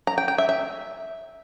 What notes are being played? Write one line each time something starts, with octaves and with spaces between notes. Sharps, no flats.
A#5
G5
G5
E5
E5